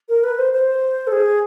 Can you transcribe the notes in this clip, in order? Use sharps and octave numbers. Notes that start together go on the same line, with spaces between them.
A#4
B4
C5
C5
A4
G#4